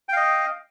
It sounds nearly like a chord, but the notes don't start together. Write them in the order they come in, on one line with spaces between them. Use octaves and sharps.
G5 F5 D#5